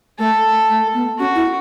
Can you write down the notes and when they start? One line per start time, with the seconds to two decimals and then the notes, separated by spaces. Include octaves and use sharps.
0.19 A3 A4
0.70 A3
0.94 B3
1.19 C#4 F#4
1.35 E4